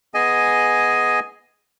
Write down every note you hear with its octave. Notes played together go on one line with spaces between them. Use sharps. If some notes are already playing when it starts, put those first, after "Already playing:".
B3 G#4 D#5 G#5